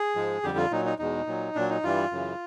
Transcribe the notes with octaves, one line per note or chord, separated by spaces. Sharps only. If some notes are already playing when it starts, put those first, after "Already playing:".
Already playing: G#4
G#2 F3 G#3
F2 D3 G3 G4
F4
A#2 F#3 D#4
D#4
E2 B2 G#3 D#4
A#2 F#3
A#2 F#3 D4
D#4
G2 E3 G3 F4
F#2 C#3 E3